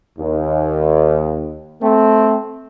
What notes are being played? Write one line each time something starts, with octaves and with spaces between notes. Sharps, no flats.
D#2
A3 C4